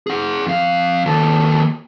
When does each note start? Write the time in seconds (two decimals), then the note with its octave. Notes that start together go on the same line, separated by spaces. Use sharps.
0.07 G#4 F#5
0.46 F2 F5
1.06 D#2 A4